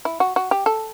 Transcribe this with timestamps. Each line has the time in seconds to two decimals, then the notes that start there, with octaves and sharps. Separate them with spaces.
0.05 E4
0.20 F#4
0.36 F#4
0.51 G4
0.66 A4